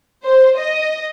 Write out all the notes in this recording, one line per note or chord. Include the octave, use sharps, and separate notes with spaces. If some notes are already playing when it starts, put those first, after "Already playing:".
C5
D#5